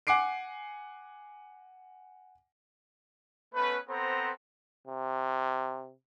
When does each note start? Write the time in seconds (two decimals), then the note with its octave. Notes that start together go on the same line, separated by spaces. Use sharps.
0.07 F#5 G#5 D6 C7 D7
3.54 A3 B3 C#4 B4
3.89 B3 C4 A4 B4 C5 A#5
4.87 C3